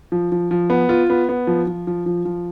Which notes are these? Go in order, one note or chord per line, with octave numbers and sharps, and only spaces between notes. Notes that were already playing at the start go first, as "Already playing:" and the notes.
F3
F3
F3
B3
F4
B3
B3
F3
F3
F3
F3
F3